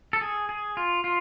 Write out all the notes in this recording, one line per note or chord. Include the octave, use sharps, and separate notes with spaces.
A4
G#4
G#4
F4
F4